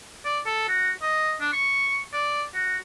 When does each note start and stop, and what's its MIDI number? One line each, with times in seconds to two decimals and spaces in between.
0.25 0.39 74
0.46 0.64 69
0.68 0.90 66
1.02 1.35 75
1.40 1.49 62
1.53 2.02 85
2.13 2.43 74
2.54 2.76 66